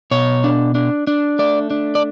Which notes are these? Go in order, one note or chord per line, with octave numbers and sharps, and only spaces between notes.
B2 C#5
D4
D4
D4
A3 D5
D4
D5